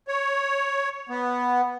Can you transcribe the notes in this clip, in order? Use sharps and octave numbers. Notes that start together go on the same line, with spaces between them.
C#5
B3